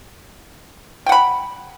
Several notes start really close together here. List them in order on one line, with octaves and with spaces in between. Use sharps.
G5 F#5 B5